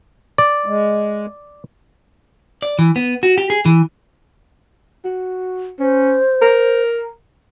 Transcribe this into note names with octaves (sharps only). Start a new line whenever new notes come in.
D5
G#3
D5
E3
B3
F#4
G4
G#4
E3
F#4
C#4 C5
A#4